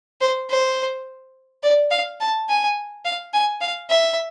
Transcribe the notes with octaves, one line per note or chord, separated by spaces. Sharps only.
C5
C5
D5
F5
A5
G#5
F5
G#5
F5
E5